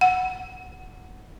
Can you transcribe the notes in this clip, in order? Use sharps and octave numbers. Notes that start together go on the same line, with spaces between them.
F#5